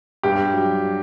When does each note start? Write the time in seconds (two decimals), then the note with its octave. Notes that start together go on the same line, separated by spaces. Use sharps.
0.23 G2 G4
0.53 F#3